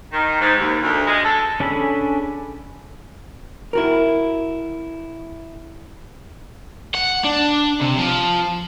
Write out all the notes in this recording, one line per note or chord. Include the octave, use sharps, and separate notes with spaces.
D#3
G#2
D#2
D2
G#3
A4
C#4 D4 G#4 A4 B5
E4 F#4 A#4
F#5
D4
C3
F3